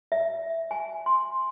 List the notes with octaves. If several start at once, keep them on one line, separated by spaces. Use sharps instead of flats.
E5
G#5
C6